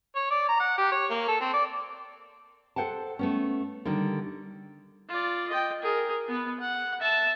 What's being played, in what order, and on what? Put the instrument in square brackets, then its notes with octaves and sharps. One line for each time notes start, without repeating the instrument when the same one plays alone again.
[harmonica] C#5
D5
A#5
F#5
G4
C#5
A#3
A4
C4
D5
[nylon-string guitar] A4 C5 F#5 G5 A5
A3 B3 C#4
D3 D#3 G3 D4
[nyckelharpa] F4 D5
D#5 G5
G#4 A#4
B3 B4
F#5
E5 A5